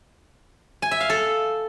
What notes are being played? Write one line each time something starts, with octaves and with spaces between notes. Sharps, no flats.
G#5
E5
F5
A4